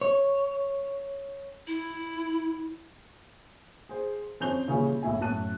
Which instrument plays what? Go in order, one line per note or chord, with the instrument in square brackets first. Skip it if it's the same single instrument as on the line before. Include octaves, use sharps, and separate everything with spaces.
[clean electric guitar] C#5
[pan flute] E4
[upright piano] G#4 C5
F2 C#4 C5 G6 F7 G7
A#2 C#3 E3 G3 C#4
F#1 B1 A2 E4 G#5
F#2 A2 A5 F#6 D#7